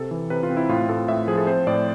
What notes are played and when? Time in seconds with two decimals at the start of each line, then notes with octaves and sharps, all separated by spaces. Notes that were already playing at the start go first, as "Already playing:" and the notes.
Already playing: C3 A4
0.11 E3
0.30 C3 B4
0.43 F4
0.50 C4
0.57 E4
0.69 A2 F4
0.88 A2 A4
1.08 A2 E5
1.28 F3 G#4
1.38 A4
1.47 C4 C5
1.67 A2 D5